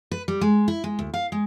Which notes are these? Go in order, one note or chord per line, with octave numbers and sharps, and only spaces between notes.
B4
G3
G#3
E4
G#3
D2
F5
G#3